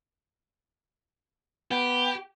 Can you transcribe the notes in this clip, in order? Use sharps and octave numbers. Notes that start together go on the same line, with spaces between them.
B3 G4